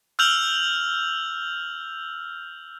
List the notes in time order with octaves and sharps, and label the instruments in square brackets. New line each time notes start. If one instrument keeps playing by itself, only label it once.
[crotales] E6 F6 G6 F7 F#7